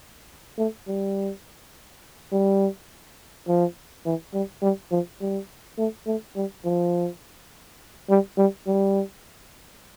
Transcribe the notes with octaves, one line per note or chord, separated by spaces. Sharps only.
A3
G3
G3
F3
E3
G3
G3
F3
G3
A3
A3
G3
F3
G3
G3
G3